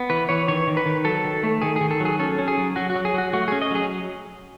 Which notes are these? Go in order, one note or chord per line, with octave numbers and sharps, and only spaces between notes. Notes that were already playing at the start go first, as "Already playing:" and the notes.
Already playing: B3
E3 B4
E3 C#5
D#3 C#5
D#3
B4
D#3
F#3 A4
D#3
A3
D#3 G#4
D#3 G#4
A4
F#3 G#4
C#4 A4
C#4
G#4
F#3
F#3 F#4
F#4
F#3
G#4
F#3 F#4
A3 F#4
C#4 G#4
D#5
F#3 G#4